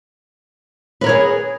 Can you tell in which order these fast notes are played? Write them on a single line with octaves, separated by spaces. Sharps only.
B4 A#4 C#5 G#4